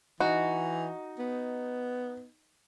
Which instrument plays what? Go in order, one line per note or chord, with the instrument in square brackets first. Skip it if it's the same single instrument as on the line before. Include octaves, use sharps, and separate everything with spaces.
[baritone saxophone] E3 [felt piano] D#4 [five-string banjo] F#4
[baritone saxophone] B3